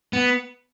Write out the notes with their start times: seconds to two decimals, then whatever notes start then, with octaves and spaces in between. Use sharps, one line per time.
0.13 B3